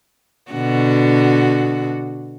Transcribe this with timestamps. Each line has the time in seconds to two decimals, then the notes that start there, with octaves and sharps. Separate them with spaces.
0.51 B2 D3 F#4